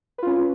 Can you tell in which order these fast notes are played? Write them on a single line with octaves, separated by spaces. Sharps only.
B4 F4 C#4